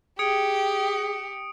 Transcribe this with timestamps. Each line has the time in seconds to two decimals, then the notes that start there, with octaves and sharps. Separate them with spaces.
0.19 G4 G#4 G5 D#6 C#7 D7